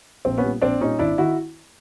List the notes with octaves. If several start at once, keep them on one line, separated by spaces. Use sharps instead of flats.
A#1 C4
B3 C#4
A#2 G3
A#1 C4 D4
A#2 G3 C#4 D#4
G#1 D4 E4
D#3 E4 F#4